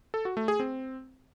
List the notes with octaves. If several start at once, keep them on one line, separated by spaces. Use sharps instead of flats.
A4
F#4
A3
G#4
C4